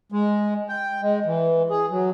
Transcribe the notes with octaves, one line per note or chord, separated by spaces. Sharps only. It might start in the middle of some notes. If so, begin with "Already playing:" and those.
G#3
G5
G#3
E3
G#4
F#3